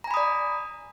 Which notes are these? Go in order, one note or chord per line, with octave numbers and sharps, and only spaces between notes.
D5 G#5 A#5 B5 D#6